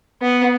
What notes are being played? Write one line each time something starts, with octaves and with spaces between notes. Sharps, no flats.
B3